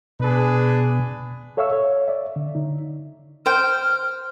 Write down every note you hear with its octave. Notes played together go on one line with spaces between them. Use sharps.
B2 D4 G#4 B4
A4 C#5 E5 F5 C#6 E6
C#5
D5 E5
D3
D3 D#4
C5 G5 F6